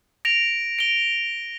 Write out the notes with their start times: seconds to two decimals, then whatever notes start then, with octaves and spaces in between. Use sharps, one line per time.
0.25 A#6 D7 F7
0.79 D7 G7